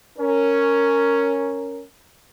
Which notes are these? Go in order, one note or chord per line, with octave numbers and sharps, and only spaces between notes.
C#4 A#4